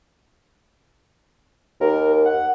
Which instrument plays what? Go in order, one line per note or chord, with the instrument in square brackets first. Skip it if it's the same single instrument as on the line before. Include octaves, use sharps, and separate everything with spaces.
[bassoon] D#2 [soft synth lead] A#4
[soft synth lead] F#5